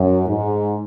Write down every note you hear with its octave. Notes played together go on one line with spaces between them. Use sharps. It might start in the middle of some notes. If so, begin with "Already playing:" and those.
Already playing: F#2
G#2